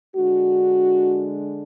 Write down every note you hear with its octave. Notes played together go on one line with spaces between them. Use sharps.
D3 G#3 D4 F#4